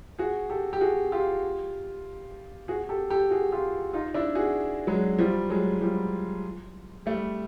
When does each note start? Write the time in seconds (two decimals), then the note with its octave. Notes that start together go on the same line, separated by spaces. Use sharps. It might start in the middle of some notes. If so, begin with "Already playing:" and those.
0.19 F#4 G#4
0.50 G4 A4
0.73 G4
0.81 F#4 G#4
1.12 F4 G4
2.68 F#4 G#4
2.89 G4 A4
3.10 G4 A4
3.31 F#4 G#4
3.52 F4 G4
3.93 D#4 F4
4.14 D4 E4
4.35 F#4 G#4
4.87 F#3 G#3
5.19 F3 G3
5.50 F#3 G#3
5.81 F3 G3
7.06 G3 A3